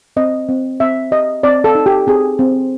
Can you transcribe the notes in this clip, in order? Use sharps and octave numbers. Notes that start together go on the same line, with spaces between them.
C4 D#5
C4
C4 E5
G4 D#5
C4 D5
A4
D#4
G4
C4 G#4
C4